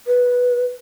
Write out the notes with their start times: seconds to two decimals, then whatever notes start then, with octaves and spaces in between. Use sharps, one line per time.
0.07 B4